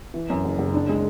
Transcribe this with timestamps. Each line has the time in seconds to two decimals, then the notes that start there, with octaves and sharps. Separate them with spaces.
0.14 E3
0.30 F#2
0.45 F#1
0.59 F#1
0.74 D4
0.89 G#3